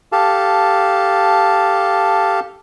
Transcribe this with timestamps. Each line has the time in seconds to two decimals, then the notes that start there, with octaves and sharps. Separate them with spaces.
0.12 G4 A4 F5 A5